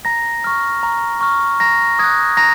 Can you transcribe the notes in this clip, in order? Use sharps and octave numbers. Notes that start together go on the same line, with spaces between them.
A#5 A#6
C#6 F6
A#5
C#6 F6
A#5 A#6
D#6 F#6 G#6
A#5 A#6